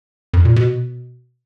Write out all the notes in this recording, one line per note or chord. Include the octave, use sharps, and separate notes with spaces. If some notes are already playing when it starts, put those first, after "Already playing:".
F2
A#2
B2